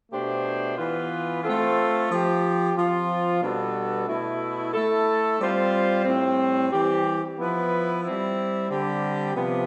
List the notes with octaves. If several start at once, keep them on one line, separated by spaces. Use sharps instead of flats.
B2 A3 D4 G4 C5
E3 B3 F4 B4
A3 C4 F4 A4
F3 C4 G4
F3 C4 F4
B2 G3 B3 D4 A4
B2 A3 E4
A3 E4 A4
G3 C4 F4 C5
A2 G3 C4
E3 G3 C4 G4
F3 B3 E4 B4
G3 C4 E4
D3 G3 C4 G4
C3 F3 B3